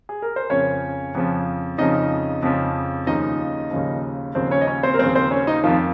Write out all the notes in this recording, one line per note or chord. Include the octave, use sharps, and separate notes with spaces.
G#4
A#4
C5
F2 C#3 F3 C#4 C#5
F2 C#3 F3
F2 C#3 F3 D#4 D#5
F2 C#3 F3
D#2 C#3 F3 D#4 D#5
D#2 C#3 F3
D#2 C#3 F3 C4 C5
C#4 C#5
D#5
C#4 C#5
C4 C5
A#4
D#2 C#3 F3 C4 C5
C4 C5
C#4 C#5
D#4 D#5
F2 D#3 F3 F4